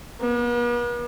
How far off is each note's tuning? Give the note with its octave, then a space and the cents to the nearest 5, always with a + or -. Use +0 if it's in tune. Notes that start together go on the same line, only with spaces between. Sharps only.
B3 -45